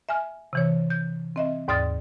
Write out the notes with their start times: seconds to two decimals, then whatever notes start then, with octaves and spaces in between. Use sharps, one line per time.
0.09 E5 G#5 F6
0.53 C3 E3 C#5
0.90 G6
1.36 C4 D#5 E5
1.68 D#2 G#2 D5 D#6 F6 A6